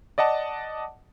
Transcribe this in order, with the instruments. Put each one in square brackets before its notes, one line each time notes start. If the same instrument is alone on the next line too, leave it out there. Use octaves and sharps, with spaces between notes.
[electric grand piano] D5 D#5 F#5 A5